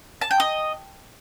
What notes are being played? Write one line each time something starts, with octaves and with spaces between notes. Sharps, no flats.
A5
G5
D#5